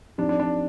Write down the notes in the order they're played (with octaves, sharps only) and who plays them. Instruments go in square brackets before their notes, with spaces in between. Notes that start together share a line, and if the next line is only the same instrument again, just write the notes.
[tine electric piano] F3 C4 D#4 G4 [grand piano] D4
[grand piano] D4
D4